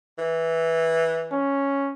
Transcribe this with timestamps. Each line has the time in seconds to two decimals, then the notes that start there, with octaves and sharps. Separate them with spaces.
0.18 E3
1.32 C#4